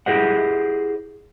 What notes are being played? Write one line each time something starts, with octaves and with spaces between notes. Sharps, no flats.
E4 G4 G#4 C5 D#5 F#5